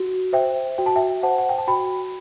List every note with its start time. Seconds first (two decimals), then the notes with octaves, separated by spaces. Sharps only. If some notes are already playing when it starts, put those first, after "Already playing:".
Already playing: F#4
0.33 C5 E5 G5
0.78 F#4 G5
0.86 A5
0.96 E5 G5
1.23 C5 F#5 A5
1.38 F#5
1.49 G5
1.58 A5
1.68 F#4 G5 B5